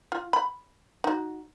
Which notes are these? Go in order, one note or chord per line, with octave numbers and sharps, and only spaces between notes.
F4
B5
D#4 F#4